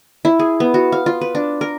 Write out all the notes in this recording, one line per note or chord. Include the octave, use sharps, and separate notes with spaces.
E4
G#4
B3
F#4
F5
F4
B4
D4
A#4